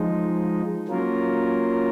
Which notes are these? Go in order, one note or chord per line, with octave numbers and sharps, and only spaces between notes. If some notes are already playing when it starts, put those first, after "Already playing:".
Already playing: F3 G#3 D#4
F#3 A#3 C#4 F4 A#4